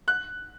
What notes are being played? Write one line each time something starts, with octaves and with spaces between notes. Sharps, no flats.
F#6